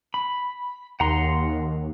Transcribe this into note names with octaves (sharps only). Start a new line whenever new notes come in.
B5
D#2 F#5 A#5 C6